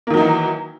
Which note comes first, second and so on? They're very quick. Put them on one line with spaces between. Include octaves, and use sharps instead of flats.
A#3 D#3 F#3 D#4 E3